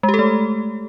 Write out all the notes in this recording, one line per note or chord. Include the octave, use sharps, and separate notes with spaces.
G#3
G4
A4
A3